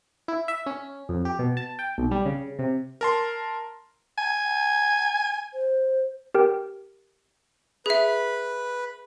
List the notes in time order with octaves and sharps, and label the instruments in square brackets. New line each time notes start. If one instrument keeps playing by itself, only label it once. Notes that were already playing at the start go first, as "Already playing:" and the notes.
[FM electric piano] E4
E5
C#4
F2
G4
B2
A5
G5
B1
G3
C#3
C3
[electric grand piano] A#4 A5 C6
[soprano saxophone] G#5
[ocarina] C5
[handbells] G4 A#4 G5
[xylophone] G#4 E5 [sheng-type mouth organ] B4